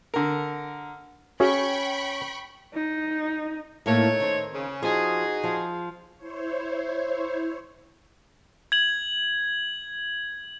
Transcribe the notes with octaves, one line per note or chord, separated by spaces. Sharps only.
D3 A#4
C#4 F#4 G#4 E5 G5 B5 C#6
D#4
A2 A3 A#3 D#4 C#5
D#3 C4
C#3
F3 D#4 F#4 G#4
F3
E4 C5 C#5
G#6 F#7